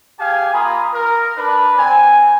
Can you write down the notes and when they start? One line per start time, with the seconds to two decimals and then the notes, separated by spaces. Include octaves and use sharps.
0.19 G4 G#4 F5 G#5
0.54 A#3 F4 A#5 B5 D#6
0.92 A#4
1.37 D4 B4
1.77 C4 G#5